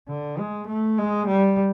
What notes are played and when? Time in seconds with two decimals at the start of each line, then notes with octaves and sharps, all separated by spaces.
0.08 D3
0.39 G#3
0.68 A3
0.98 G#3
1.27 G3